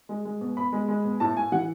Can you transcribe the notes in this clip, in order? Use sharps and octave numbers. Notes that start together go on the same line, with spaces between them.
G#3
G#3
B2
B2 B5
G#3
G#3
B2
A2 A5
A2 G#5
E3 F#5